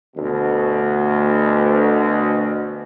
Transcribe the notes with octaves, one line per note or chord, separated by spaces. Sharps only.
D2 B2